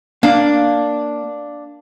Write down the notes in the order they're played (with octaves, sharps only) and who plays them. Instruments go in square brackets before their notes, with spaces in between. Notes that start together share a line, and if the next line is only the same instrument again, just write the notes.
[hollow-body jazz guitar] A#3 F5 [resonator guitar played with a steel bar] D4